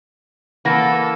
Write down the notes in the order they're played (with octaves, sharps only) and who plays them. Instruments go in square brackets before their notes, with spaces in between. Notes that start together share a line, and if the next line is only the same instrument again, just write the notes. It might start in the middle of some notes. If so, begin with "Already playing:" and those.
[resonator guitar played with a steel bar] E3 A#3 [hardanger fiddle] A4 [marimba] F#5 A#6